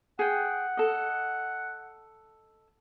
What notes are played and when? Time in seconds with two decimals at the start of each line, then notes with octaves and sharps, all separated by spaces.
0.19 G#4 F#5 G5
0.77 A4 D#5